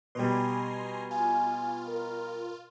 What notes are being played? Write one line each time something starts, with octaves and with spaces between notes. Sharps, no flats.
B2 G3 G#5 A#5 C6
F4 G#5
A#4